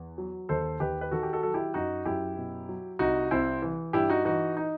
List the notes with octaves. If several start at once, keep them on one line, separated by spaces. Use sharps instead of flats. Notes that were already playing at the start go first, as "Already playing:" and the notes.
Already playing: E2
F#3
D#2 A4 C5
D#2 G4 B4
B4
D#3 F#4 A4
G4
F#4 A4
F#3 A4
E4 G4
F#2 D#4 F#4
F#2 E4 G4
B2
F#3
C2 D#4 F#4
C2 C4 E4
E3
G2 E4 G4
D#4 F#4
E3 D#4 F#4
D#4